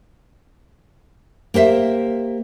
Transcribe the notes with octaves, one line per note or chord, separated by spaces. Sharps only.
A#3 G4 C5 E5